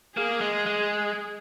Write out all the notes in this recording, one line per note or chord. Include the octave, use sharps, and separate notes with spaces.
A#3 G#4
G#3
G#3